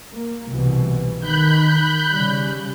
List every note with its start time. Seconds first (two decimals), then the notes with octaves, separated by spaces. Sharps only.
0.13 A#3
0.48 C2 B2 E3
1.20 D#3 B5 F#6 G6
2.10 C#3 G3